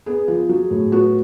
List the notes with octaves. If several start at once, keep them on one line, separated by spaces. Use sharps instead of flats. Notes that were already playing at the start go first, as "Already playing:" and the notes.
B3 G#4
F3
F#3
A2
B3 F#4